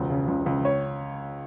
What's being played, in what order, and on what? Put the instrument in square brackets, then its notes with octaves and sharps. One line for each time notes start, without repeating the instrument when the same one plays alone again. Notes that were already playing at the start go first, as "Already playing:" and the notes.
Already playing: [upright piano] E1 C#2
C#3
C#2
C#2
C#5